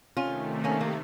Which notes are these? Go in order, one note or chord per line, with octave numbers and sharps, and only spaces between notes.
C3 D#3 A3 C#4 F4
A#3 C#4
A#3